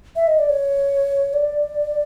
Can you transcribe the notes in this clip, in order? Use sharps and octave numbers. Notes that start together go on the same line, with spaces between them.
E5
D#5
D5
C#5
D5